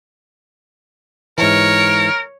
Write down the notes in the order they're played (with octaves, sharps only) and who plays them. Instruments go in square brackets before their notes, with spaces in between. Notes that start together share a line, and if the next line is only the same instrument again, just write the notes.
[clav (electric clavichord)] G#2 E3 [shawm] A#4 [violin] C#5